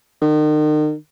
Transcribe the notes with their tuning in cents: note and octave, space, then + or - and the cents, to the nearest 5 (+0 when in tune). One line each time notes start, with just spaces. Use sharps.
D#3 -40